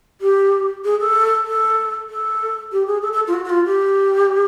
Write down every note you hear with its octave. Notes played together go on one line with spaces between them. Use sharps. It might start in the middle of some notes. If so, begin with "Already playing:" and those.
G4
G#4
A4
A4
A4
G4
G#4
A4
A4
F4
F#4
F#4
F4
G4